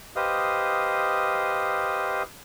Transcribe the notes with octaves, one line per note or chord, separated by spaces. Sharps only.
G4 B4 C5 D#5 F5 D#6